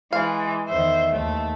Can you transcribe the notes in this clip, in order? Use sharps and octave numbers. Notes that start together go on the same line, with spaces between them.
E3 G#3 F5
E2 D#3 C5 E5
D#2 A3